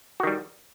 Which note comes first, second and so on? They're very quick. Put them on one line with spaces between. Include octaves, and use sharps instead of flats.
F#4 D#3 G3